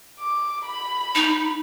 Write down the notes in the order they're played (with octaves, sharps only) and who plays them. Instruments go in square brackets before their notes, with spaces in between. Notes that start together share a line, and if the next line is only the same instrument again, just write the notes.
[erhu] D6
B5
[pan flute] D#4